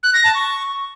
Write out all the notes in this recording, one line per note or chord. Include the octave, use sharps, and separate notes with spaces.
F#6
A#6
A5
C#6